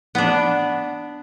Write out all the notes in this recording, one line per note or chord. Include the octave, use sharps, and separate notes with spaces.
B3 D4